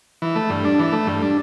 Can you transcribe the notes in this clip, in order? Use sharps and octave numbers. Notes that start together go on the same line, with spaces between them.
E3
A3
G2
D4
E3
A3
G2
D4